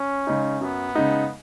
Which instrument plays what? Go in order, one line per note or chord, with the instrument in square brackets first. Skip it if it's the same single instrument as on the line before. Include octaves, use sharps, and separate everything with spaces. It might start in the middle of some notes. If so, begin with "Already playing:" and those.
Already playing: [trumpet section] C#4
[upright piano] C#3 G#3 D#4
[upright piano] F#2 [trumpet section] B3
[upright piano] C#3 G#3 D#4